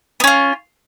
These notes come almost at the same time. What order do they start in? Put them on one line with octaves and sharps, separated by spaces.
B3 C#4 F4